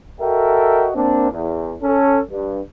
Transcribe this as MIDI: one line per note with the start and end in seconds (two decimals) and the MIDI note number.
0.20 0.90 66
0.20 0.90 69
0.20 0.90 70
0.20 0.90 75
0.20 0.90 76
0.20 0.90 79
0.95 1.30 58
0.95 1.30 60
0.95 1.30 62
1.31 1.75 40
1.83 2.20 61
1.83 2.20 69
2.30 2.60 43